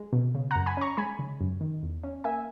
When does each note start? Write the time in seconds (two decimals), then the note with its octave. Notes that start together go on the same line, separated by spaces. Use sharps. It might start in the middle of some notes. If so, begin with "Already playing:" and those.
Already playing: G#3
0.13 B2
0.35 C#3
0.51 F#2 F#5 A#5
0.66 G#5 B5
0.77 C#4 A#5 C#6
0.97 G#3 G#5 B5
1.19 C#3
1.41 F#2
1.61 D#3
1.83 E2
2.04 C#4
2.24 A#3 E5 G#5